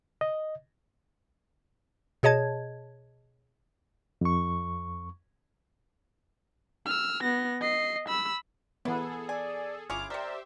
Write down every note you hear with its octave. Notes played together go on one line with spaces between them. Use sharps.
D#5
B2 G#4 C#5 D#5 A5 G#6
F2 C#6
E6 F6
B3 A#6
D#5 C7
B5 E6
E3 B3 E4 G#4 A4
D5 G#5
G1 C#4 E4 F4 G#4 D6 F6
C3 G4 A#4 C5 D5 E5